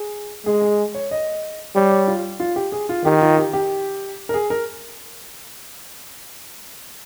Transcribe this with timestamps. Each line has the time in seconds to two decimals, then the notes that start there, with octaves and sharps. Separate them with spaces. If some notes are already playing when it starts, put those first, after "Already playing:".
Already playing: G#4
0.46 G#3 G#4
0.62 G#4
0.94 C#5
1.11 D#5
1.76 G3 C#5
1.91 C#5
2.08 F4
2.40 F4
2.56 G4
2.72 G#4
2.89 F4
3.04 D#3 G4
3.21 F4
3.38 G4
3.53 G4
4.29 A#4
4.34 G#4
4.50 A#4